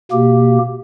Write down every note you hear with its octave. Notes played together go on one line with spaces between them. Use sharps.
B2 A#3 G4